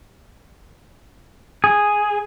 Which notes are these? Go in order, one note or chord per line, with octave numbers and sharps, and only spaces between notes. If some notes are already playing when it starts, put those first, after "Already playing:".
G#4